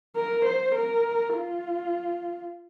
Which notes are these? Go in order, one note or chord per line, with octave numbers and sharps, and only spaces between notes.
A#4
C5
A#4
F4